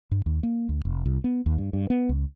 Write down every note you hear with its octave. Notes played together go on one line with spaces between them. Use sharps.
G2
D#2
A#3
D2
F1
C2
B3
D#2
G2
G2
B3
C#2